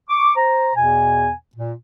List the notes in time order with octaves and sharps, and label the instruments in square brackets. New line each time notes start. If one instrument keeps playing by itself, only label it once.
[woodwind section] C#6 D6
C5 A#5
E2 B2 G#5
A#2